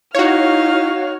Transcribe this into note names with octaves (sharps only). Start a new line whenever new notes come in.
D#4 E4 F#4 C#5 F5 F6